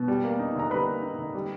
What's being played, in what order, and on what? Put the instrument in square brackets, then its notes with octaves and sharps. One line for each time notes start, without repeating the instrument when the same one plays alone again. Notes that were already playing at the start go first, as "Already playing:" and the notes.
Already playing: [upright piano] B2
G3
A#3
D#4
D3 A#5
G3 B4 B5
A#3
D#4
D3
G3